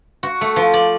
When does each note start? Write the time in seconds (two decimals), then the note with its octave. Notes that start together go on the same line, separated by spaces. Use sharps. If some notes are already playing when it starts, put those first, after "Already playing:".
0.23 F#4
0.41 A3
0.56 F3
0.73 D5